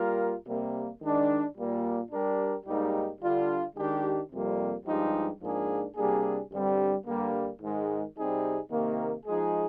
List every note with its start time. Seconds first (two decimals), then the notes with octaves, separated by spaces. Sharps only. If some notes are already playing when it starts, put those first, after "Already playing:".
Already playing: G3 A#3 F4 A#4
0.46 C3 G3 A#3
1.01 D#3 G#3 D4
1.56 A#2 G3 A#3
2.11 G3 D4 G4 A#4
2.66 G#2 G3 A#3 D#4 G4
3.21 D3 G3 D4 F4
3.76 D#3 G#3 D4 G4
4.31 F2 C3 G3 A#3
4.86 G2 F3 G#3 D#4 G4
5.41 G#2 F3 A#3 D4 G#4
5.96 C3 G3 A#3 D4 G#4
6.51 G2 D3 G3 C4
7.06 G2 D3 G3 A#3
7.60 G#2 D#3 G#3
8.16 C3 G3 C4 D#4 G#4
8.70 C3 D#3 A#3
9.25 F3 G#3 D#4 G#4